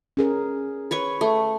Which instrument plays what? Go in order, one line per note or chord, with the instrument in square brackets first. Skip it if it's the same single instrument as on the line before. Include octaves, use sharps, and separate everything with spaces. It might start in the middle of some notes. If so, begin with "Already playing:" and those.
[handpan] C#4 G#4 A#4
[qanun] B4 C#5 C#6
A3